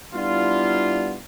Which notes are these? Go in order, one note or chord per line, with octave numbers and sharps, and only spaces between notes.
G3 B3 D4 E4 F4